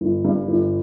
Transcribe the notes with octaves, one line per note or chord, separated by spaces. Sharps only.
G1
G2
G1